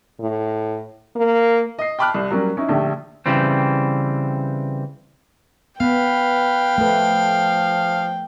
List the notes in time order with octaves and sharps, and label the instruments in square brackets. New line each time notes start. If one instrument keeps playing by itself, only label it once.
[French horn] A2
A#3
[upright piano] D#5 C7
G5 A5 B5 D6 F6 F#6
C2
F#3 G3 A#3 C#4
C#4 D#4 E4
A#1 D3 A3 G4
[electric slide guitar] C#3 E3 G3 C4
[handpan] B3 [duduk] B4 [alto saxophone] F5 [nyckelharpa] G5
[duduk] F3 [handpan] A3 B4